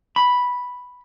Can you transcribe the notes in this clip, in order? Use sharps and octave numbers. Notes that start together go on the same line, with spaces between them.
B5